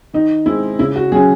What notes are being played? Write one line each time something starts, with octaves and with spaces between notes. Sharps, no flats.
D#3 D#4
G#3 C4 E4
C#3 E4
F#4
F#3 C#4 G#4